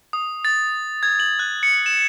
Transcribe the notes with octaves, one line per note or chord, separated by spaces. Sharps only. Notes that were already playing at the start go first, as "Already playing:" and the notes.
D#6
A6
G#6
F#7
F#6
C#7
E7